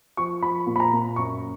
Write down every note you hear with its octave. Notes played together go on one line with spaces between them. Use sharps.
F3 C#6
F3 B5
A#2
B5
A#5
A#2
F#2 C#6